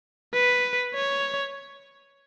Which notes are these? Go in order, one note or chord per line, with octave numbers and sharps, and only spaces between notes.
B4
C#5